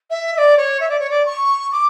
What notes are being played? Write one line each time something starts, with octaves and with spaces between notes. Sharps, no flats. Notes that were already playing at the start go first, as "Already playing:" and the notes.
E5
E5
D5
C#5
E5
D5
C#5
D5
C#6
D6